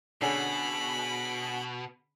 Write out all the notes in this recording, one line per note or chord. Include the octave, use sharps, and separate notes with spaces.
B2 D3 C#4 G#4 B5